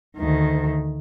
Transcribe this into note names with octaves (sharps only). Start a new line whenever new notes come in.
D2 D#3